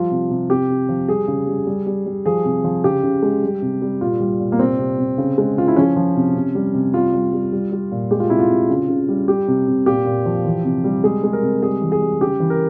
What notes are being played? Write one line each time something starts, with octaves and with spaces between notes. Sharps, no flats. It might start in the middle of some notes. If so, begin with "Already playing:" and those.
Already playing: F3 G3 F4
C3
C3
C3 G4
C3
F3
G3 G#4
C#3
G3
G3
G3
G3
F3 G#4
C3
F3
C#3 G4
C#3
G#3
G3
C3
G3
A#2 F4
G3
A#2
A#3
C3 C4
C3
C3
C#3
G#3
C#3 F4
E4
F3 C#4
F3
C3
C3
G3
C3
G3 F4
G3
G3
G3
G3
A#2
G#3 G4
F4
C3 E4
F4
C3
C#3
C#3
G3
G3 G4
C3
C3
A#2 G4
A#2
F3
E3
C3
G3
G#3 G#4
G#3
A#4
C3
G3 G#4
E3
G#4
G3
C#3 G4
E3
A#4